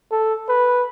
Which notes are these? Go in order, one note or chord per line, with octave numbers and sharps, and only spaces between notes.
A4
B4